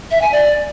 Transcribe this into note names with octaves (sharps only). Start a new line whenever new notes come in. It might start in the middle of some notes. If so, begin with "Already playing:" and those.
E5
G#5
D5